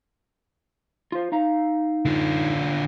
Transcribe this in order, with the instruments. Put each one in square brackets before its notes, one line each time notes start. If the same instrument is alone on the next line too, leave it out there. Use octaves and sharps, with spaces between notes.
[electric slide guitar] F4 C5
D#4 F5 A#5
[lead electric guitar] D3 F4